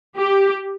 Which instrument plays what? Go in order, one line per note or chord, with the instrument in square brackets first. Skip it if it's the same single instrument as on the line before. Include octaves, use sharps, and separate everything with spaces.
[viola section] G4